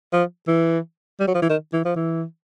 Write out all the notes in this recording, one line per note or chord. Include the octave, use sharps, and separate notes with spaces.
F3
E3
G3
F#3
F3
E3
D#3
E3
F3
E3